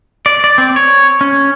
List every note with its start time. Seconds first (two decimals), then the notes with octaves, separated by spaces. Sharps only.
0.26 D5
0.44 D5
0.58 C4
0.76 C#5
1.21 C#4